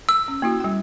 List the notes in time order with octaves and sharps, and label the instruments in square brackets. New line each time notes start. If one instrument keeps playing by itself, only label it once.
[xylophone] E6
[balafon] C#4
A#3 E4 F#4
G3 G5